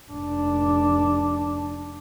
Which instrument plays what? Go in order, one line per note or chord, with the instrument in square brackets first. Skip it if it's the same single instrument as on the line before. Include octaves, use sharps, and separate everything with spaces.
[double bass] F1 D4